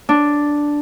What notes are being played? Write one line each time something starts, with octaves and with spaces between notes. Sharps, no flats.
D4